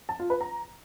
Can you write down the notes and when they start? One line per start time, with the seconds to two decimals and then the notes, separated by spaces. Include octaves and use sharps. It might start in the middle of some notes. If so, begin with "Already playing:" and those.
0.09 A5
0.19 F4
0.30 B4
0.41 A#5